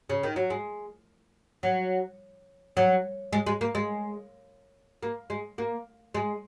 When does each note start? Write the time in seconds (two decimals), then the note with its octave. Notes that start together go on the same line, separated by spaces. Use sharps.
0.10 C#3
0.23 D#3
0.36 F#3
0.50 G#3
1.63 F#3
2.77 F#3
3.33 G#3
3.47 G#3
3.61 A#3
3.75 G#3
5.03 A#3
5.30 G#3
5.58 A#3
6.15 G#3